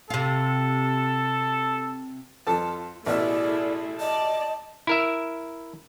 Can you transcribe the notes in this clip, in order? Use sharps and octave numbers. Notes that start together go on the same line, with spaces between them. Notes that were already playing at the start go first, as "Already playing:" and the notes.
C3 F4 A4
F2 F4 A4 A5
A1 B2 A3 E4 G#4 D5 E5
D5 D#5 A5
E4 A#4 E5